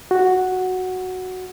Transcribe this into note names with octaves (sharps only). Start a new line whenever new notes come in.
F#4